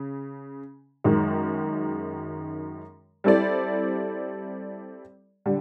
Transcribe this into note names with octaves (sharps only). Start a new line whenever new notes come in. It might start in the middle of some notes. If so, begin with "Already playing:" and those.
Already playing: C#3
F#2 D#3 G#3
G3 C4 E4 A4 D5
D3 G3